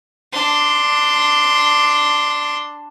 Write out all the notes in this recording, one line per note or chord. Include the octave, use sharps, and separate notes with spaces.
D4 C6